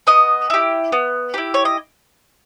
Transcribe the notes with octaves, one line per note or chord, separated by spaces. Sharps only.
B3 D#5
E4 G4
B3
E4 G4
C#5
D#5